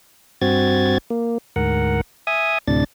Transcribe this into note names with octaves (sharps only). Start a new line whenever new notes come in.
G2 C4 F#4 G#6 A6
A#3
D2 G#2 A#4 F#5
E5 G#5 D#6
D2 A2 C3 D4 A6